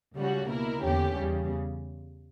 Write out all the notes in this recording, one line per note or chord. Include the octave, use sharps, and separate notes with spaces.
C#2 C#3 G3 C#4 F#4
B2 A#3 E4 A#4
E2 D3 A#3 C#4 G4
E2 C#3 G3